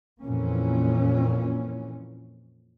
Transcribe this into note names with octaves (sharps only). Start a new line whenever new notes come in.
F2 A#2 E3 A#3 C#4